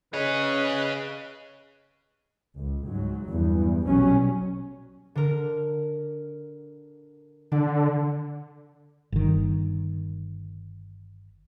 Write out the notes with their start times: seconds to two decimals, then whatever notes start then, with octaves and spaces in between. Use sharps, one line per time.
0.14 C#3 G#4 B4 C#5 D#5
2.58 C#2
2.88 G#2 F#3
3.26 E2 G2
3.85 A#1 B2 F#3 G3 C#4
5.15 D3 A#4
7.52 D3 D4
9.12 G1 D#3